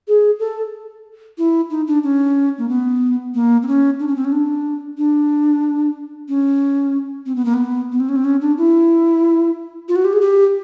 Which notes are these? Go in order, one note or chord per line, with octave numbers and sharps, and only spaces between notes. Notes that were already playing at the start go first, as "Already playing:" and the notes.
G#4
A4
E4
D#4
D4
C#4
A#3
B3
A#3
C4
C#4
D4
C#4
C4
C#4
D4
D4
C#4
C4
B3
A#3
B3
B3
C4
C#4
C4
C#4
D4
E4
F4
F#4
G4
G#4
G4